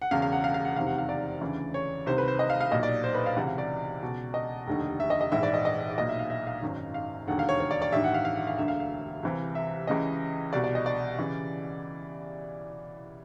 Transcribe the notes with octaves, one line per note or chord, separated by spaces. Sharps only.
F#5
E1 E2 C#3 F5
F5
F#5
F5
F5
F#5
F1 E2 C3 D#3 F5
F#5
F5
D5
D2 C#3 E3
C#5
C2 C3 D#3 C5
B4
C5
D#5
F5
F5
B1 A#2 D#5
D5
C5
B4
F5
C#2 C3 E3 F#5
F5
D5
C#2 B2
D#5
F1 D#2 D3
E5
D#5
D#5
A#1 G#2 E3 E5
D5
D#5
D#5
B1 A#2 D#5
E5
F5
E5
F5
G#1 F#2 D#3
F5
E1 D#2 D3 F#5
F5
C#5
C#5
D5
D5
A1 G2 D#3 E5
F#5
F5
F5
F#5
F5
E1 D2 D3 E5
F5
F5
C2 C3 E3
E5
C#2 C#3 E3 D#5
C2 B2 D5
D5
D#5
D5
C#3 E3